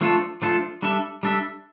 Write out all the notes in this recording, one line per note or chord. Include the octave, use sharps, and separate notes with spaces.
F3 A3 D4 F4 A4
F3 A3 D4 F4 A4
G3 D4 A4 E5
G3 D4 A4 E5